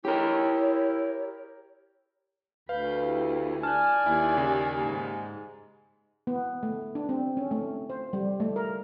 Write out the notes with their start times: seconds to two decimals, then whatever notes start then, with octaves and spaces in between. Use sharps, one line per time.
0.05 E4 G4 A#4 C#5
2.69 D2 B4 F5 B5 G6
3.05 E4 G4
3.63 D5 G#5 A5 F6 F#6
4.06 D#2 E4
4.37 C#3 G4
4.86 G#2
6.27 B3
6.63 A3
6.95 D4
7.09 C4
7.37 C#4
7.51 A3
7.90 C5
8.13 G3
8.40 A3
8.56 A#4